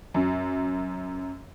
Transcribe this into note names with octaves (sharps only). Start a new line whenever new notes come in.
F#2